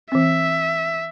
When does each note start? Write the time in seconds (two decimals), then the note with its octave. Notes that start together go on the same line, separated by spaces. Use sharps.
0.12 E3 C4 E5